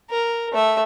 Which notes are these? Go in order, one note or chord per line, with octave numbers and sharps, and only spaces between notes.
A#4
A3 E5